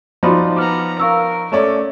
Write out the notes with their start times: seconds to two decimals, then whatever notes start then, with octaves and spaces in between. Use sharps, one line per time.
0.23 F3 D#4 F#4 C5 D5 B5 C6
0.56 B3 A#5 D6 F6
1.00 A#4 F5 C#6 E6
1.52 A3 C#4 D5